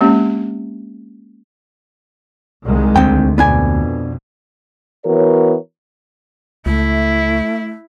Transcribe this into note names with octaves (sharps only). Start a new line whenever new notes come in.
G#3 A#3 C4 C#4 G4
C2 D#3 G#3
D2 C4 G5
F2 B2 B3 D4 G#5
E3 B3 F#4 A#4 C#5
C#2 A3 E4